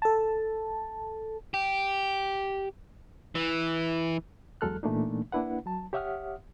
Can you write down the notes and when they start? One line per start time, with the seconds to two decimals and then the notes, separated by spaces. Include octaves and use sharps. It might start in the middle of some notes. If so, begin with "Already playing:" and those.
0.02 A4 A5
1.54 G4
3.35 E3
4.61 E2 F#3 G#3 A4 F6 F#6
4.83 A#2 E3 A3 A#3 D4 D#4
5.32 A#3 D4 E4 B4 F#5
5.66 F#3 A5
5.93 G4 C#5 E5 F#5 D#6 F6